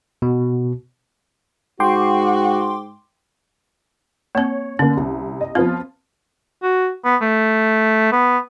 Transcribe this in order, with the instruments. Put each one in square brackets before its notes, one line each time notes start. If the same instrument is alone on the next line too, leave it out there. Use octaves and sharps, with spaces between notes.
[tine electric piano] B2
[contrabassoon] G#2 [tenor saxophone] F#4 [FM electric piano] G5 C6 D6
[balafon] A#3 C4 [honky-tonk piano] C#5
[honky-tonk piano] D3 A#3 [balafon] C#4
[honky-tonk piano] C2
D#5
[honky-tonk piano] F3 B3 F4 [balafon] C4
[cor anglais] F#4
B3
A3
B3